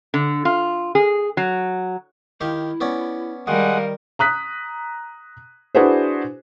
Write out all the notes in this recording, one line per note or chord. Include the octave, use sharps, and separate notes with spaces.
D3
F4
G#4
F#3
D#3 E4 G4 F5
B3 C#4 D5
D#3 G3 G#3 A#4 F5 F#5 D#6
A#5 D#6 F#6 B6
D4 E4 F#4 G#4 B4 C5